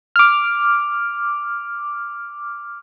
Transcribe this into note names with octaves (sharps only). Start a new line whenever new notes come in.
D6 F6